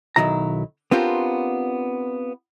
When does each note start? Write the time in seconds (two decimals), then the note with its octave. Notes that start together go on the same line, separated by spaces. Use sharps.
0.16 B1 D#3 F#3 E4 A#5
0.91 B3 C4 D4 F4 G4 A#4